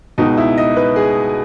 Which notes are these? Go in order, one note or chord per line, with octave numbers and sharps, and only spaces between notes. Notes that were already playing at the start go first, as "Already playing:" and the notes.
C#2 B2 D#4
E4
D#5
B4
G#4